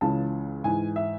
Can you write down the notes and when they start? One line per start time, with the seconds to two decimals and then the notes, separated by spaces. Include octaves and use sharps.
0.01 C#2 C#3 E3 A5
0.64 G#2 E3 G#5
0.96 E5